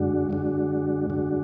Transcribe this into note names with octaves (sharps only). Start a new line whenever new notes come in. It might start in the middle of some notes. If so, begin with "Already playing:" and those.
Already playing: F#2 D3 G#3 D4 F#4
F#2 D3 G#3 D4 F#4
F#2 D3 G#3 D4 F#4